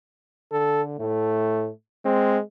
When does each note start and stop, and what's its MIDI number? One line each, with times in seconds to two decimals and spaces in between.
0.52 0.96 50
0.52 0.82 69
1.00 1.69 45
1.00 1.72 57
2.05 2.42 56
2.05 2.38 60